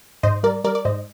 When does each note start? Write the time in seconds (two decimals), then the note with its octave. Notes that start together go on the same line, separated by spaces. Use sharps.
0.23 G#2 C5 D#5
0.43 G3 A#4 D5
0.64 G3 A#4 D5
0.75 D5
0.85 G#2 C5 D#5